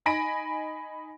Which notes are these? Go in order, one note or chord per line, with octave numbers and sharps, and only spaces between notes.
D#4 G#5 B5 A#6 D7